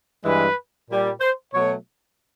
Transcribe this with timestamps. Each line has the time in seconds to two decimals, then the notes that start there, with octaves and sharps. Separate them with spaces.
0.25 G2 E3 G#3 B4
0.89 A#2 G3
1.21 C5
1.53 B2 F#3 A3 C#5